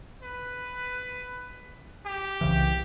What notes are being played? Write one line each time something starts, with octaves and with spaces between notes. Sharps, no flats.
B4
G4
C2 C#3 E3